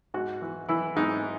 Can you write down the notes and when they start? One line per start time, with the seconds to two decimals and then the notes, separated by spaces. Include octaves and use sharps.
0.14 G#2 F#4
0.42 E3
0.69 E3 E4
0.96 G#2 D#4